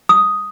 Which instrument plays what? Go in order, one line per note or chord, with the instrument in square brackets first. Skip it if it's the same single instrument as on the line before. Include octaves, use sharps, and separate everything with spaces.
[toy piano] D#6